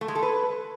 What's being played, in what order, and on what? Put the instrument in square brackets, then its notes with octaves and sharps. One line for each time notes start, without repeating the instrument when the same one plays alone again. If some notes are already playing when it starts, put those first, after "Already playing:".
[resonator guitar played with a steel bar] A3
G#3
A4
B4